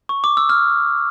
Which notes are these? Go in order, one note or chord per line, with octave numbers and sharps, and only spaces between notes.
C#6
D6
E6
F6